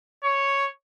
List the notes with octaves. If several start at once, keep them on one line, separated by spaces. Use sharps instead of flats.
C#5